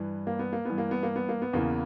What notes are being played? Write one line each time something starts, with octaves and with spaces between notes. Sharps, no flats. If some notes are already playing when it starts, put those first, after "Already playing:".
Already playing: G2 E3
A#3
B3
A#3
G2 E3 B3
A#3
B3
A#3
B3
A#3
B3
E2 C#3 E3 A#3